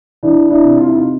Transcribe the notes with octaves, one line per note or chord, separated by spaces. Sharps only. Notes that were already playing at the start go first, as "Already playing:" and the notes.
E3 D4 E4
D4 E4
C3
F4
E4
D#4 F4